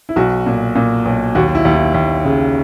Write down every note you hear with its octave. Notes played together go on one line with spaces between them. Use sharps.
E4
B1 F#4
A#2
A#2
B1
D#2 F#4
E4
D#2
E4
D#2
C#3